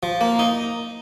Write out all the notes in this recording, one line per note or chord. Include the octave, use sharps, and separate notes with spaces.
F3
A#3
D#4